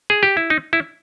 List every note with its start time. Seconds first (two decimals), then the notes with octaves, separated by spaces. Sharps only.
0.10 G#4
0.23 G4
0.37 E4
0.50 D#4
0.73 E4